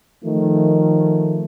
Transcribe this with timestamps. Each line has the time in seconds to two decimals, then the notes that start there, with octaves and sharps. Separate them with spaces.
0.23 D#3 F3 A3